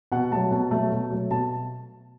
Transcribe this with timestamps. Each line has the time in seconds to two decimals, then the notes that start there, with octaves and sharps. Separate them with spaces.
0.12 B2 F#5
0.31 F#3 A3 A5
0.51 B2
0.71 F#3 A3
0.91 B2
1.10 F#3 A3
1.31 B2 A5